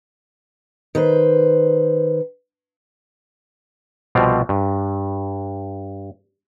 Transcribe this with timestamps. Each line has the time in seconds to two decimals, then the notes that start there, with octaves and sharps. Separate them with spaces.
0.95 D#3 B4 C5
4.15 C2 B2 F3 C4 D5 F5
4.49 G2